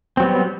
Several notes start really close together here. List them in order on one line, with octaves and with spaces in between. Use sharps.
C4 F#3 B3 G3